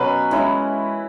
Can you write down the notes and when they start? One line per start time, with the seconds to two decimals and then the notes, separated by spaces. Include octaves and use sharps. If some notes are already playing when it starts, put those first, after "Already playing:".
Already playing: B2 F#3 C#4 B4
0.31 E3 G#3 C#4 E4